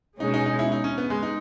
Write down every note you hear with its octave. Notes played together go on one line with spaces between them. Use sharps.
B2 G#3 C#4 D#4
D#4
D#4
E4
D#4
C#4
B3
G#3
D#4